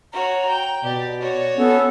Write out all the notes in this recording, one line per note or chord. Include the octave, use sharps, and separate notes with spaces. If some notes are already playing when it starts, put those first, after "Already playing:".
F#4 C#5 A#5
G5
B2 G4 D5
F#4 C#5
B3 C#4 A4